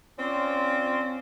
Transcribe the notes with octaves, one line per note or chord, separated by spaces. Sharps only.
C4 C#4 F4 D5